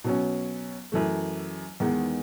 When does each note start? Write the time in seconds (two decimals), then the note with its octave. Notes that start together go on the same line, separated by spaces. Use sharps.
0.04 B2 F#3 C#4
0.92 F#2 E3 A3
1.80 E2 D#3 G#3 B3 D#4